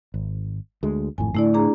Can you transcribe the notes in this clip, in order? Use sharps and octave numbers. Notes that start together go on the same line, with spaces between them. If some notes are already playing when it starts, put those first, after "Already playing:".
G#1
D2 G#3
G#1 F2 A2 G#5
A2 D3 A3 E4 D5
D4 G#4 A#5